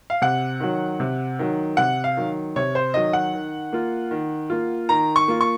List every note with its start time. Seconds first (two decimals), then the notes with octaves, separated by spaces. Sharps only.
0.10 F5
0.22 C3 F#5
0.60 D#3 F#3
1.00 C3
1.39 D#3 F#3
1.77 C3 F#5
2.04 F5
2.17 D#3 F#3
2.56 C3 C#5
2.75 C5
2.94 D#3 F#3 D#5
3.13 F#5
3.34 D#3
3.73 A#3 F4
4.11 D#3
4.50 A#3 F4
4.89 D#3 A#5
5.16 C#6
5.28 A#3 F4
5.41 C#6